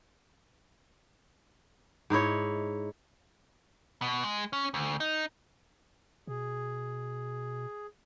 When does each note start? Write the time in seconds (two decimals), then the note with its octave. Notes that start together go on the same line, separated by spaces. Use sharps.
2.10 G#2 D#4 E4 C#5
4.02 B2
4.24 G#3
4.53 C#4
4.74 D2
5.00 D#4
6.27 B2 G#4